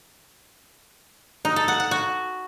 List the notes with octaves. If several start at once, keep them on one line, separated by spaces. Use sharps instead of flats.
D#4
A4
F#5
F#5
F#4